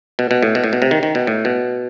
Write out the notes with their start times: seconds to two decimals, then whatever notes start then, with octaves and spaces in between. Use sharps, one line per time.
0.19 B2
0.31 B2
0.43 A2
0.55 B2
0.64 A2
0.73 B2
0.82 C3
0.91 D#3
1.03 D#3
1.15 B2
1.27 A2
1.45 B2